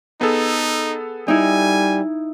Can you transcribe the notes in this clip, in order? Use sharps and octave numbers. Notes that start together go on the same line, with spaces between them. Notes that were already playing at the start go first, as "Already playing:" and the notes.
B3 D#4 G#4 A4
G3 D#4 E4 G#5